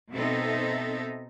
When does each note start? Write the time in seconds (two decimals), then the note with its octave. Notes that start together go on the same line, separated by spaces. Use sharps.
0.13 B2 C4 D#4 A4 E5